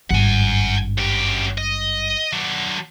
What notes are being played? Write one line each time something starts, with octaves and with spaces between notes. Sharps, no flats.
G#1 G2 F#5 G#5
F#2 G4
D#5
F#3 D4